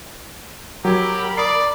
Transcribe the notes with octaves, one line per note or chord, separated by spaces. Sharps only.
F#3 G4 A#4 B5 G#6
D5 D#6 C7